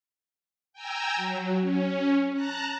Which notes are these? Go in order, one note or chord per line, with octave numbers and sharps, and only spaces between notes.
G5 G#5 A#5 E6
F#3
C#4
A5 A#5 F#6